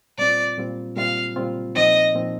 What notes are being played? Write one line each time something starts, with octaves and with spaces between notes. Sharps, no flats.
A#2 G3 C4 F4 D5
A#2 G3 C4 F4
A#2 G3 C4 F4 F5
A#2 G3 C4 F4
A#2 F3 C4 D#4 D#5
A#2 F3 C4 D#4